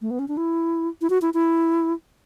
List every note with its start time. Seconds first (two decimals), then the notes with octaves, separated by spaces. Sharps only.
0.01 A3
0.11 B3
0.19 C#4
0.28 D4
0.37 E4
1.01 E4
1.10 F#4
1.22 E4
1.34 E4